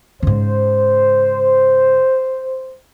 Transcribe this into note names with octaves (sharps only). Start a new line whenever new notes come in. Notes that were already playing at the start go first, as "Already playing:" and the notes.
G#2 C#3 C5